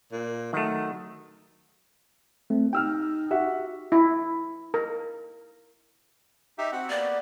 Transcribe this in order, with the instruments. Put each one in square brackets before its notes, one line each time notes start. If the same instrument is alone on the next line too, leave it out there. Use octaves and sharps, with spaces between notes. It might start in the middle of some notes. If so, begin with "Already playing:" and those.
[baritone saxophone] A#2
[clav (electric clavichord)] D#3 A3 [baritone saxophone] F#3
[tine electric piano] A3 C4
[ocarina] D#4 [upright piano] G4 E6 F6 [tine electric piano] G5
[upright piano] F#4 E5 F#5 [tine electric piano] G4
[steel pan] E4
A#4
[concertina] D#4 G4 E5
C4 F#4 F#5
[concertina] A#3 B3 G4 [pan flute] D5